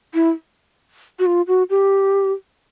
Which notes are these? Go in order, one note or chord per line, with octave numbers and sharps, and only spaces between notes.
E4
F#4
F4
F#4
G4